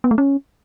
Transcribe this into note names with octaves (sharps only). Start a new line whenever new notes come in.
B3
A3
C#4